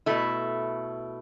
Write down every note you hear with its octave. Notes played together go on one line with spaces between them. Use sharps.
B2 A3 E4